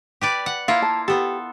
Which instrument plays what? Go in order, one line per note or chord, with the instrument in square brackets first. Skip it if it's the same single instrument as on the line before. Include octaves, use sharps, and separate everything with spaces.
[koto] G4 B4 D5
F#5
[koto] A#3 E4 F4 [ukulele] F5
[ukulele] A5
[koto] B3 A4 [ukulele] G4